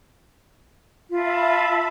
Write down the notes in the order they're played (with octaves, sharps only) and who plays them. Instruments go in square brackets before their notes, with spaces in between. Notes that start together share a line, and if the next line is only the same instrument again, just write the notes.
[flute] F4 [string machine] E5 A5 B5